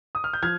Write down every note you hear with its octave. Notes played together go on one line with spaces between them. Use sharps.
D#6
F6
G6
F3 F6 G#6